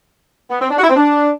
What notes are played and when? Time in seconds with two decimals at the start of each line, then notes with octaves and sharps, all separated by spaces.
0.51 B3
0.61 C4
0.71 D4
0.78 F#4
0.83 E4
0.90 C4
0.96 D4